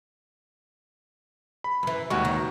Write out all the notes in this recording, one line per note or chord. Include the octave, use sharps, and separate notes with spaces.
B5
F#2 E3
D#2 G3 G#3 F#4 C#6
D#3